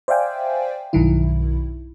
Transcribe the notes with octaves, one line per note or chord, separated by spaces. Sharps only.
C5 D5 E5 F5 G5 G#5
B1 G2 D#3 F#3 E4